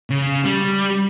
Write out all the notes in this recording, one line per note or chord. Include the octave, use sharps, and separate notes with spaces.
C#3
G3